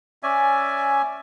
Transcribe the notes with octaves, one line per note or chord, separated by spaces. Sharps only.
C#4 D5 E5 G#5